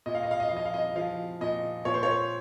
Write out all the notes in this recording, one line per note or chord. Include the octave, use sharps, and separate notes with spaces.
A#2 D#5
F5
D#5
F5
D#5
F3 F5
D#5
F5
D#5
F3 F5
A#2 D#5
A#2 C#5
C5
C#5